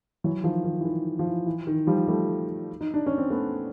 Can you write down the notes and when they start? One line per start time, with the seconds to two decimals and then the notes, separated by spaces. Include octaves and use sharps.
0.24 E3 F#3
0.44 D#3 F3
0.64 D#3
0.81 E3
0.85 D#3
1.19 F3
1.27 E3
1.46 E3
1.67 D#3
1.87 F3 G3
2.07 G3 A3
2.81 D#4
2.94 D4
3.06 C#4
3.18 C4
3.30 A3 B3